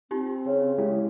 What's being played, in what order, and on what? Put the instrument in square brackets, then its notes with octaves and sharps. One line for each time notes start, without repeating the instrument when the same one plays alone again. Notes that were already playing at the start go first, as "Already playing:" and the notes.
[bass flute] C4 [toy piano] D#4 F4 G4
[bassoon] C#3
[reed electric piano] G#3 E4 G4 [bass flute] G#4